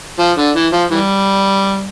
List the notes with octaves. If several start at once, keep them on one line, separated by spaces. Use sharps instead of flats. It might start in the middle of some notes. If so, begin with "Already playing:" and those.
F3
D3
E3
F3
E3 G3